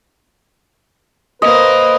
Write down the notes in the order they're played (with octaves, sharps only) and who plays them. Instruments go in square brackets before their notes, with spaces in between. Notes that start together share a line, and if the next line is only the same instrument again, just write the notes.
[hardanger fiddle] A#3 C5 [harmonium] B4 [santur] D#5